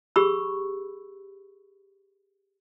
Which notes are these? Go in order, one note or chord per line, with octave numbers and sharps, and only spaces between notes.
G4 G#4 B5 C#6 E6